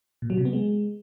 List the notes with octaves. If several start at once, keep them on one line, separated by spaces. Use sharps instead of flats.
A#2
F#3
C3
B3
G#3